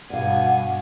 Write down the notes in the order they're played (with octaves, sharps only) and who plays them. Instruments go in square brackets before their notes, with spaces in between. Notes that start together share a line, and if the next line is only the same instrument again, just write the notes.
[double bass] G2 [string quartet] B2 G#5 [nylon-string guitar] D5 F5 [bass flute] F#5